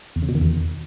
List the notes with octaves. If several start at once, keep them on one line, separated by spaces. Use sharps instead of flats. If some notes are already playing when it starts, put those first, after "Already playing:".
E2
C#3
B2
D#3
E2